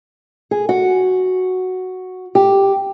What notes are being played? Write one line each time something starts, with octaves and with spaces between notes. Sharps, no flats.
G#4
F#4
G4